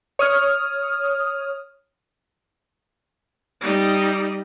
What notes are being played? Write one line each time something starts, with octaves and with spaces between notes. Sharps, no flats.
C#5 D#6 F6
G3 D#4